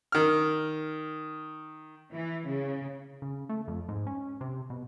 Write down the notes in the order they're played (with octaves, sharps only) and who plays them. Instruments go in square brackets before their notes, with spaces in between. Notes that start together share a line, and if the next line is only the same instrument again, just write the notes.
[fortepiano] D#3 F6
[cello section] E3
C#3
[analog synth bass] C#3
A3
F2
G#2
C#4
C3
B2